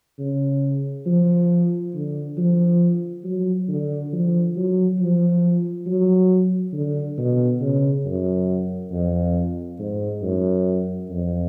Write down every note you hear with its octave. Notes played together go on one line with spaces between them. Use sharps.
C#3
F3
D3
F3
F#3
D3
F3
F#3
F3
F#3
D3
B2
C#3
F#2
F2
G#2
F#2
F2